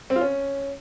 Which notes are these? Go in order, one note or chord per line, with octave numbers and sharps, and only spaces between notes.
C4
F4
C#4